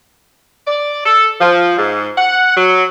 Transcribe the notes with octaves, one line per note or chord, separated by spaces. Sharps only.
D5
A4
F3
G#2
F#5
F#3